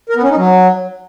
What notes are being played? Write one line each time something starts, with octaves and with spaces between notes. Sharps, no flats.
A#4
B3
C#4
D#4
F#3